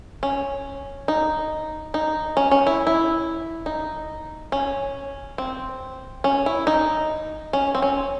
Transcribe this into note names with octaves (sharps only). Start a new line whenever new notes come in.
C#4
D#4
D#4
C#4
C#4
E4
E4
D#4
C#4
C4
C#4
E4
D#4
C#4
C4
C#4